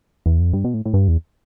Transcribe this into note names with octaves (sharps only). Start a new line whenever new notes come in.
E2
F2
G2
B2
A2
A2
G2
E2